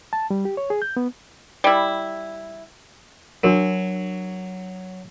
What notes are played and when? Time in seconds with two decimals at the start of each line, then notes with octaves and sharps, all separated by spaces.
0.13 A5
0.31 G3
0.45 G4
0.57 C#5
0.70 G#4
0.82 G6
0.97 B3
1.64 G3 E4
3.44 F#3 D4 F#4 A#4